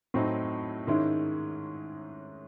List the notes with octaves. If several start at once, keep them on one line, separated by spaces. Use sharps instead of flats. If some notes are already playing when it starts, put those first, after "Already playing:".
A2 F#3 C4 D#4
G#2 D#3 G#3 C#4 E4